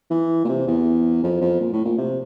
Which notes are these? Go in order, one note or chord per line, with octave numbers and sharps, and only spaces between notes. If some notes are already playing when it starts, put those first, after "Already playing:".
E3
A#2
C3
E2
F2
F2
A#2
A2
A#2
C3